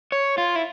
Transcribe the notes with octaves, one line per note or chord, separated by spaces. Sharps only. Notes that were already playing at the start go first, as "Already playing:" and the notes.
C#5
F4
E4